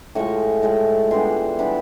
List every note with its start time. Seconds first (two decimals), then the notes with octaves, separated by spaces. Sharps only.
0.15 A2 F3 G#3 C#6
0.63 A2 F3 G#3
1.11 E3 G3 B3 D4 C6
1.59 E3 G3 B3 D4 B5